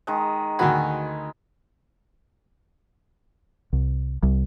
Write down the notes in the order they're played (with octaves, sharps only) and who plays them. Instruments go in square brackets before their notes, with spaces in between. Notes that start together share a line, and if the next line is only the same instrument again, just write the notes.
[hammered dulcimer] D#3 G#3
[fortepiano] D2 D#3 F#4 [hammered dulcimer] G#5 B5
[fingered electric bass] C2
C2